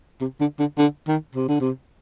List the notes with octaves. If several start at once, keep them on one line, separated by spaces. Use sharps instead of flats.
C3
D3
D3
D3
D#3
C3
D3
C3